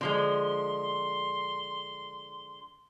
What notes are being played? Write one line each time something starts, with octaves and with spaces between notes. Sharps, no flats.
D3 F3 G#3 C6